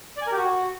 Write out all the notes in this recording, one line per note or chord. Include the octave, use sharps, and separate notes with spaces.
D5
G#5
A#4
G4
F#4